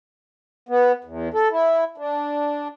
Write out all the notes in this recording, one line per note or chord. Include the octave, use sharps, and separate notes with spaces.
B3
E2
A4
E4
D4